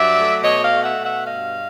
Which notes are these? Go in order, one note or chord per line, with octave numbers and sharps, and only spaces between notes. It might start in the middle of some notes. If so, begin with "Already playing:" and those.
Already playing: G2 F#3 D5 E5
A3
B2 C#5 D#5
D#5 F5
A3
E5 F#5
B2
E5 F#5
G2 D#5 F5